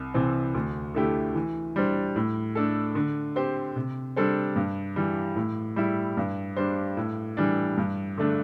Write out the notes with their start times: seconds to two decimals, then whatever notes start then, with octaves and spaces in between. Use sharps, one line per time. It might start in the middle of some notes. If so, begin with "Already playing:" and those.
Already playing: C2
0.14 C3 E3 C4
0.54 D2
0.95 D3 A3 E4 G4
1.35 E3
1.76 G3 D4 C5
2.16 A2
2.55 A3 D4 A4
2.95 D3
3.36 C4 G4 C5
3.76 C3
4.16 G3 D4 A4 C5
4.56 G2
4.96 E3 G3
5.36 A2
5.76 G3 E4
6.17 G2
6.57 G3 D4 C5
6.97 A2
7.37 E3 G3 D4
7.77 G2
8.18 D3 A3 D4